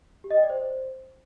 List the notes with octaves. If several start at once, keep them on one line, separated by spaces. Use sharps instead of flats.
G4
D#5
G5
D5
C5